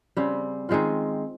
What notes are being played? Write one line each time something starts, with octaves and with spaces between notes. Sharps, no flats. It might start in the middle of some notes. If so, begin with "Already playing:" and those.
C#3 G3 C4
D#3 G#3 C4 F4